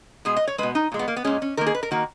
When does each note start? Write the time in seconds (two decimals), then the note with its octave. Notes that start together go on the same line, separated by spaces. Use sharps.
0.25 B2 G#3 G#4
0.37 D#5
0.48 C#5
0.58 B2 G#3 B4
0.75 D#4
0.92 A#2 G#3
0.99 B3
1.08 A#3
1.16 B3
1.24 A#2 G#3 C#4
1.42 C#4
1.57 D#3 A#3 A#4
1.67 G#4
1.75 B4
1.83 A#4
1.91 D#3 A#3 F#4